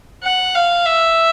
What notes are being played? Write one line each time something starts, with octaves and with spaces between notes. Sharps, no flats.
F#5
F5
E5